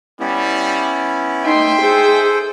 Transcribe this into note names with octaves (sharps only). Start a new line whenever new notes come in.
G3 B3 C#4 E4
D#4 E5 G5 C6
G#4 A4 C5